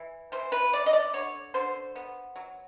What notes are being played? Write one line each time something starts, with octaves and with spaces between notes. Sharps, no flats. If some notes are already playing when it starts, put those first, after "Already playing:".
Already playing: E3
E3 C5
B4
E3 D5
D#5
D5
D3 C#5
D3 C5
B3
F#3